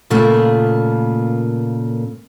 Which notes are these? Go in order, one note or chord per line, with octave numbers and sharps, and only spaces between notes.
A#2 C#3 A3 A#3 F4